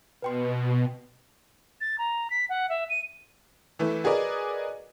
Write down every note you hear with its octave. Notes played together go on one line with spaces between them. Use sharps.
B2 B4 G5 C6
A6
A#5
B6
F#5
E5
D#7
E3 A3 E4 B4
F#4 G#4 A#4 B4 D5 D#5